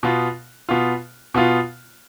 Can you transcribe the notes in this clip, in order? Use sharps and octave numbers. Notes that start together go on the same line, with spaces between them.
B2 B3 F4
B2 B3 F4
B2 B3 F4